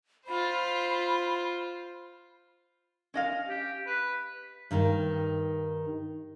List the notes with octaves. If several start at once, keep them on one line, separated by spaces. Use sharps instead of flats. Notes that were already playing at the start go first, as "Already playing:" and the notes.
F4 C5 B5
C#4 D#5 F5
G4
B4
G2 D#3 D#4